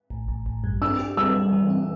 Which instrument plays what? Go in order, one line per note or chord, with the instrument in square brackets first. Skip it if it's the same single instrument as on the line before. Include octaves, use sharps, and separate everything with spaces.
[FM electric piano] A1
A1
A1
G2
[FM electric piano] D4 [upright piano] E6
[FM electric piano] G4
[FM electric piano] G3 [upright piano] E6
[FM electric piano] G3
E3
D4